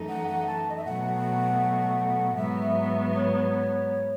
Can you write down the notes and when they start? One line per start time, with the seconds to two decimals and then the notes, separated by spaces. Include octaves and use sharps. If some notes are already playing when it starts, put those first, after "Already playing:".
Already playing: F#2 E3 A3 D#4
0.09 F#5
0.28 F#5
0.47 A5
0.70 D#5
0.77 E5
0.85 B2 F#3 A3 F#5
2.37 G#2 F#3 B3 E5
3.13 C#5